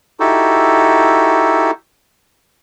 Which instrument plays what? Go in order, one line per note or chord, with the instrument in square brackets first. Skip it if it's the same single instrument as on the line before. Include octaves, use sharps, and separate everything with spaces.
[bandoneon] D#4 E4 F#4 G4 A4